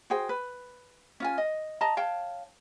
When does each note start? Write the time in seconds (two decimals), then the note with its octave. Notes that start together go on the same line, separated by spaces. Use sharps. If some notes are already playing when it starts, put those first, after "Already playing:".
0.10 F#4 G#4 C5 G5
0.29 B4
1.20 C#4 F4 G#5
1.38 D#5
1.81 D#5 A5 A#5
1.97 C#5 F5 G5 A5